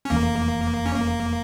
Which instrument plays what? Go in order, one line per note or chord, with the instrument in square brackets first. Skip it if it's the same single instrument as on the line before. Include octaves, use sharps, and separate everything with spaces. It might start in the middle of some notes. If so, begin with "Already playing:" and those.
[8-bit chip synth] C#4
[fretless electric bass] F1 E2 E3 A3 [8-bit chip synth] A#3
[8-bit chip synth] C#4
A#3